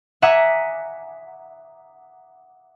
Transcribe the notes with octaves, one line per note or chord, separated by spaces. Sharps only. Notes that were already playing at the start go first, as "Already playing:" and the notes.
E5 F#5 G#5 A#5 D6 D#6